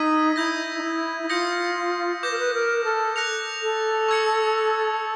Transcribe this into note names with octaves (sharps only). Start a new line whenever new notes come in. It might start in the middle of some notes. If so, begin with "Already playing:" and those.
Already playing: D#4 E6 G#6 B6 D#7
E4 D#6 G6 A#6
D#4
E4
E4
F4 D#6 G6 A#6 C#7
B4 D6 G6 A#6
A#4
B4
A#4
A4
F#6 A#6 C#7 F7
A4
C#6 E6 G#6 C#7